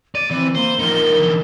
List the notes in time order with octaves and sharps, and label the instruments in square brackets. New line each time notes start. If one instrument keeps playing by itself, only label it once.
[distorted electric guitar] D5 [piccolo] D#7
[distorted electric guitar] E3 [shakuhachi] C4
[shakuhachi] A#3 [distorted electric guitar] C5 [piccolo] G7
[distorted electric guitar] F3 D#4 [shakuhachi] A#4
[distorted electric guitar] D3 E3